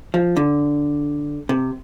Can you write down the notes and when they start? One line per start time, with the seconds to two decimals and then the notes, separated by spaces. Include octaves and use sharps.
0.14 F3
0.36 D3
1.49 C3